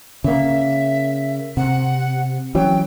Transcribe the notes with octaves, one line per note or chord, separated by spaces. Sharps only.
C#3 A#3 E5
C3 F#5
E3 F#3 C#4 G5